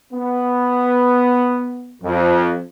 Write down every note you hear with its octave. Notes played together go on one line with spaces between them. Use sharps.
B3
F2